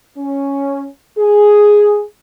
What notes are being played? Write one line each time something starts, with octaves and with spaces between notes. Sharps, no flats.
C#4
G#4